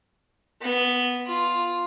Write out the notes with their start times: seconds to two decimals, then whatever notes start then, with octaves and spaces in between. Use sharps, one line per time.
0.62 B3
1.27 F4